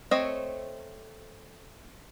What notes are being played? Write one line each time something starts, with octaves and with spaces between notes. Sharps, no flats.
A3 C4 C#5 D#5